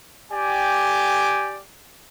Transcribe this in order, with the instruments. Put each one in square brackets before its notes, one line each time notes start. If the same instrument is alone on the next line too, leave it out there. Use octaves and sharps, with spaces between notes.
[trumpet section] G4 D5 G5 G#5